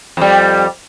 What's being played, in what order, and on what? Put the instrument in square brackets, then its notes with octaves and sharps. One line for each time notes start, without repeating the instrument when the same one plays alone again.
[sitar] F2 G3